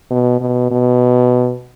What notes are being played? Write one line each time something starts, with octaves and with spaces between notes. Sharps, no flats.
B2
B2
B2